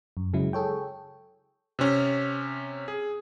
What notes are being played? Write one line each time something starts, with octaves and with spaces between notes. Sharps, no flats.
F#2
C#3 F#3 G#3 E4
G#4 A4 C#5 G5
C3 C4 C#4
G#4